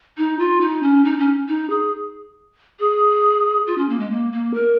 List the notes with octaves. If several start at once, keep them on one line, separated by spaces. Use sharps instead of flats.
D#4
F4
D#4
C#4
D#4
C#4
D#4
G#4
G#4
F4
C#4
A#3
G#3
A#3
A#3
A#4